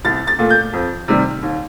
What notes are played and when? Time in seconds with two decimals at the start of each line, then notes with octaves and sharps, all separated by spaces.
0.05 C2 A6
0.27 A6
0.39 A#2 A3
0.50 G6
0.73 F2
1.08 C3 D#3 G3
1.43 D#2